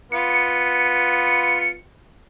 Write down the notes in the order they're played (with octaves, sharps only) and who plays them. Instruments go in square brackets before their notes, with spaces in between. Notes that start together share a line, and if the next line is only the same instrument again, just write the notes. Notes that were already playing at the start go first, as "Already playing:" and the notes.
[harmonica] B3 F4 [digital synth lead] C#7